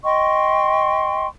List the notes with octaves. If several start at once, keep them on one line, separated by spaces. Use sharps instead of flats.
D#5 G5 C6 C#6